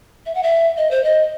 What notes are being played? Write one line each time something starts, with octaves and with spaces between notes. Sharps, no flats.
E5
F#5
E5
D#5
C5
D#5